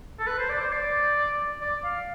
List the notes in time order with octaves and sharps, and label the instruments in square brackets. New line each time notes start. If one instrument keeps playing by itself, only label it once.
[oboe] A4
B4
C5
D5
C5
D5
D5
F5